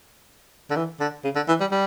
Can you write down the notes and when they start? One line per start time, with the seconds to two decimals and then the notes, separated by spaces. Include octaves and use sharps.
0.70 D3
0.76 E3
1.00 D3
1.24 C#3
1.36 D3
1.48 E3
1.60 G3
1.71 G3